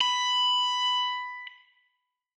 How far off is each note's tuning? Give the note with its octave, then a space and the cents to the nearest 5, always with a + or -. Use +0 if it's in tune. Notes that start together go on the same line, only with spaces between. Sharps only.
B5 +10